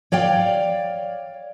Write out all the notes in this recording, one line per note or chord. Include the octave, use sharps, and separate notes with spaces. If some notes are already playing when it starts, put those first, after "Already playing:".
C#5 D5 F5 G5